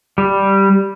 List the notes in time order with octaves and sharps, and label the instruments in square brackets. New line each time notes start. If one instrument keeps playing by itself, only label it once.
[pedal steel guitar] G3